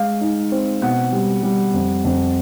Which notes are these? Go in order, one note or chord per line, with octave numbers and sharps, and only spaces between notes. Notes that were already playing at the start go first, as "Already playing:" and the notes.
Already playing: G#3 F5
D#4
C4
B2 F#5
G3
G3
F2
F2